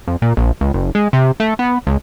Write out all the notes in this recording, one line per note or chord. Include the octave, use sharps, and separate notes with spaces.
F2
A#2
A#1
C#2
F#1
G#3
C3
A3
B3
C#2